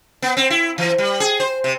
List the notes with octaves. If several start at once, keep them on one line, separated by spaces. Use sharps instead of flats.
B3
C4
E4
E3
G3
G#4
C5
C3